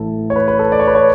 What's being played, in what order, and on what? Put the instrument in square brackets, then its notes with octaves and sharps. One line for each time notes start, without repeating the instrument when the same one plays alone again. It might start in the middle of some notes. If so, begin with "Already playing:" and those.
Already playing: [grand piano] A1 A2 E3 A4
C#5
B4
B4
A4
D5
C#5
B4
C#5